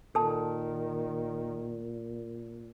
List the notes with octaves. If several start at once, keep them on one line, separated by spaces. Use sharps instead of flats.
A#2 D#3 A4 A5